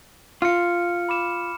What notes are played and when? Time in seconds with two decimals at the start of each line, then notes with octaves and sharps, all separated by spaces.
0.42 F4 F6 C#7
1.09 B5 D6 E7